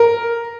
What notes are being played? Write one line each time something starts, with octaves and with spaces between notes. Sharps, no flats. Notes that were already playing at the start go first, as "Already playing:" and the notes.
Already playing: A#4